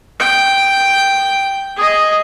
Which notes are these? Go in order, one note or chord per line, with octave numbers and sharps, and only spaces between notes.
G5
G#4 D#5